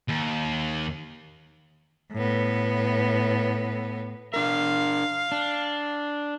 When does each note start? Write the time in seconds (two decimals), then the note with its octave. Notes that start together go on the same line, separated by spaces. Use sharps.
0.09 D#2
2.12 A2 B3
4.34 D4 A#4 F5
5.32 D4